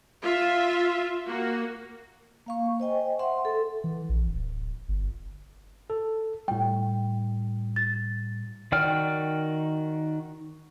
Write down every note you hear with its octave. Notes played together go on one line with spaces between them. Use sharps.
F4 E5
A#3 F#4
A#3 F5 C#6
C5 D#5 G5 G#5
E5 F#5 C6
A4
E3
A#1
D1
G1
A4
A2 G3 G5
A6
D#3 F#4 D5 G5 F6